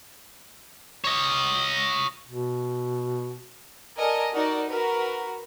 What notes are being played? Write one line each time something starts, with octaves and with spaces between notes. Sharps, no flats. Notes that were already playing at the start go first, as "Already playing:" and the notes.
C#5 D#5
B2
A4 A#4 D5 D#5 G#5
D#4 F#4 A#4 D5
F#4 A#4 B4